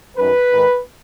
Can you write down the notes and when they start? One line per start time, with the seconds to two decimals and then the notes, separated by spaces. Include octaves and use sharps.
0.17 F#2 D#3 B4
0.51 G#2 D#3